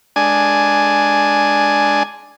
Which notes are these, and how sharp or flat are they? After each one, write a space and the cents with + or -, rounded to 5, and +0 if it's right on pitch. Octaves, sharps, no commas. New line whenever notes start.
G#3 +10 D4 +0 G#5 +0